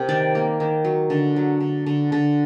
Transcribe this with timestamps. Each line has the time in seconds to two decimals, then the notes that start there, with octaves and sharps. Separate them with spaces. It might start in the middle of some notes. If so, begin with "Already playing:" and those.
Already playing: C3 A#3
0.09 D#3 D5
0.35 A#3
0.60 D#3
0.85 F#3
1.10 D3
1.36 F#3
1.61 D3
1.86 D3
2.12 D3